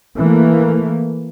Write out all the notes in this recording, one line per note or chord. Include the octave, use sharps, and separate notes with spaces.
E3 A3 A#3